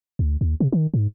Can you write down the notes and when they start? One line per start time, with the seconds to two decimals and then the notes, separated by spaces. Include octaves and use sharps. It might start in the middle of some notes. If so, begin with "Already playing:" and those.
0.19 D2
0.41 D#2
0.60 C3
0.72 D#3
0.94 G#2